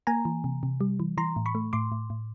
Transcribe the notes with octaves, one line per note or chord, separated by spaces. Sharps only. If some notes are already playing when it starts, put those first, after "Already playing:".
A#3 G#5 A#5
E3
C3
C3
G3
E3
E3 A#5 C6
A2
B5 C#6
A3
A2 C6 D6
A2
A2